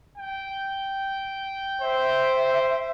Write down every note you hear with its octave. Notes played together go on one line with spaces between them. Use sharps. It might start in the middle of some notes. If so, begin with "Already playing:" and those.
G5
C5 E5